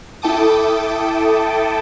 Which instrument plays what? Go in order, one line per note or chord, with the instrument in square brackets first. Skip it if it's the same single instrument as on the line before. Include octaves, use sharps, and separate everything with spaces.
[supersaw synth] E4 A4 G5 A5 D6 D#6